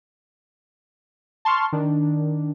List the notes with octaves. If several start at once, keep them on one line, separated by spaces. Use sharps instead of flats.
A5 C6 C#6 F6
D#3 D4